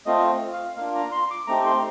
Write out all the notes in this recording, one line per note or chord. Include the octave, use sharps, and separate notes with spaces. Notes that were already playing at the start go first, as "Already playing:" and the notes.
A3 C4 F4 D#5
F5
A#3 D4 F4 F5
A#5
C6
D6
A3 C4 D#4 G4 A#5
C6